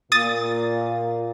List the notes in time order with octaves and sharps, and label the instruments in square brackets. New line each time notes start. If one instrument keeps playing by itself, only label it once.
[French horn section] A#2 [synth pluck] D#6 A6